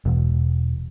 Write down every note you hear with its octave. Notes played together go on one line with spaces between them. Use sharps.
E1